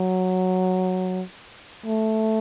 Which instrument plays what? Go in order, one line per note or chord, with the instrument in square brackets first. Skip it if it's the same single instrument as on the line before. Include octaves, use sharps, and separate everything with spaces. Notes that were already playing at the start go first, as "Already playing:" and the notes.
Already playing: [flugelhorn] F#3
A3